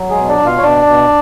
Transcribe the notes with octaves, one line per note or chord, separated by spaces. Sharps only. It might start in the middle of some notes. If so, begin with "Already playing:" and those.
Already playing: F#3
G#3 G#4
B2
D4 D5
B2
F4 F5
C#5
B2 D4 D5
B2